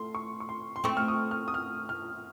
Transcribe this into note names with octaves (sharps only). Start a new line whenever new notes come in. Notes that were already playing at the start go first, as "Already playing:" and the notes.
Already playing: A3 C6
C#6
C#6
C6
C6
A3 C4 C#6
F6
D#6
F6
D#6
F6
F6